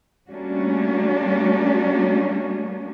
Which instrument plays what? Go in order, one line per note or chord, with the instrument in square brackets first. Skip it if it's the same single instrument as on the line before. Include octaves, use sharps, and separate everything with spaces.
[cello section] G3 A3 A#3 C#4 D4 F#4